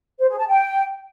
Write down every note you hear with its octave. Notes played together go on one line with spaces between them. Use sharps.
C5
G#4
A5
G5